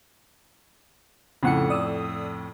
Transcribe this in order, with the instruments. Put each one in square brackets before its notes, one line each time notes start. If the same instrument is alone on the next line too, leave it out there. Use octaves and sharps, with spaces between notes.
[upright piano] F2 A2 [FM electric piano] C#3 F#5 C#7
[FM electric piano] D5 D#6 E6